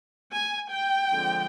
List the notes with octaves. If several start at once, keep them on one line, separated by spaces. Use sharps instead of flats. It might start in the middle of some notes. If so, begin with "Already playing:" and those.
G#5
G5
D3 F3 G#3 C4